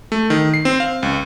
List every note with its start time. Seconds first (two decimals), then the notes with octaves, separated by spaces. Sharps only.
0.12 A3
0.30 D#3
0.54 C7
0.65 C4
0.80 F5
1.03 C#2